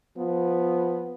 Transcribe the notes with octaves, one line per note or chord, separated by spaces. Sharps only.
F3 B3